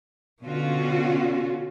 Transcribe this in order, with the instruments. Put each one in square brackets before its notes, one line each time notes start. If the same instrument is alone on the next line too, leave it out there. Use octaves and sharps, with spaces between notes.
[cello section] B2 D3 C#4 F4 F#4